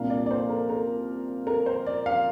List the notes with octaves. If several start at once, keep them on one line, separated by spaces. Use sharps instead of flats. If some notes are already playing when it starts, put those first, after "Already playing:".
Already playing: C2 A#2 A#3 D4 F5
D5
D5
C5
A#4
A#4
A#4
C5
D5
F5